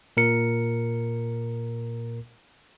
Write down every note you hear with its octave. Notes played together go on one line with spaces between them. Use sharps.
A#2 A#4 C#7